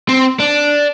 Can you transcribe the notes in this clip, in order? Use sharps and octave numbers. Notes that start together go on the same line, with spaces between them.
C4
D4